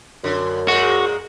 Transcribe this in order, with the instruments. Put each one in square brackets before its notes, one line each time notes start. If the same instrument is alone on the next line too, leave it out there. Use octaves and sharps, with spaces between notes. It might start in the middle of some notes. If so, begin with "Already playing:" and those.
[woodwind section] F#2 [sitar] D3
[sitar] A#2 G#3 [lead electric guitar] F#4